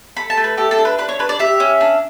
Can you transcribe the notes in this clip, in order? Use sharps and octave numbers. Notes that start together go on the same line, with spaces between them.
A4 B5
A5
A3
B4
G4 A4
A4
D4
B4
D4 B4
C#5
D4 B4
D5
G4 E5
C#4
D4